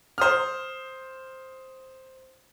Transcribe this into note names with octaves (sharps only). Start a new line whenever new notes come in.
C5 D#6 F6